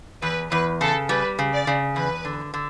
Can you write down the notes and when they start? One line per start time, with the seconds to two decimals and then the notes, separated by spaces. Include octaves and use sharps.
0.22 E2 B4
0.51 E2 B4
0.81 C#3 A4
1.09 G3 B4
1.39 C#3
1.53 D5
1.67 C#3
1.96 E2 B4
2.25 D3
2.54 D3